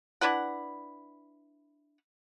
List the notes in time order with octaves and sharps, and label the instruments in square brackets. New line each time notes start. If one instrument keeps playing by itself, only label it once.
[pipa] D4 E4 B4 F#5